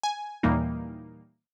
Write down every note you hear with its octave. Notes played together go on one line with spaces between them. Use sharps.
G#5
D#2 A#2 E3 G3 A#3 D#4